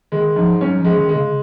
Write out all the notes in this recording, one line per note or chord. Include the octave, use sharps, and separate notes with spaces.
D#3 G#3
G#2 F3
F#3 C#4
F3
G#3
D#3
G#3
C#3